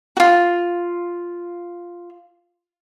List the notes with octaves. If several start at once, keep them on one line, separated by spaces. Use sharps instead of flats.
F4 F#4